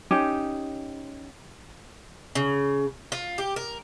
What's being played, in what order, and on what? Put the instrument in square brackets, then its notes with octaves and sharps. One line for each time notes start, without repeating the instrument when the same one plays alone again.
[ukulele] C#4 D#4 G4
[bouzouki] C#3
F4
G4
A#4